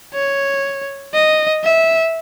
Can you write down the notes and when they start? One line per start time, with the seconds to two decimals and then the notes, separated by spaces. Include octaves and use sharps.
0.13 C#5
1.13 D#5
1.64 E5